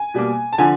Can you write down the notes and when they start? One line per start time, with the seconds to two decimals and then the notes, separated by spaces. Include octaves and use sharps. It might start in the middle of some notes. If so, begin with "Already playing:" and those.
Already playing: G#5
0.14 B2 G3 A#3
0.53 A5
0.58 D3 F3 G#5